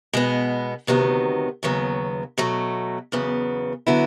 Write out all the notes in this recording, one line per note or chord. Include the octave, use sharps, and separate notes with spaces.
B2 G#3 B3
D2 C3 D#3 F#3 B3
D#2 C#3 F#3 B3
B2 F#3 A3
E2 C#3 F#3 B3
D3 F#3 B3 E4